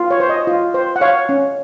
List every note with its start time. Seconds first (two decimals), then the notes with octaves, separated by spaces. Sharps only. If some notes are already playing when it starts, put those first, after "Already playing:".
Already playing: F4
0.11 C#5
0.20 C5
0.29 D#5
0.47 F4
0.74 C5
0.96 F#5
1.01 C#5 F5
1.29 C#4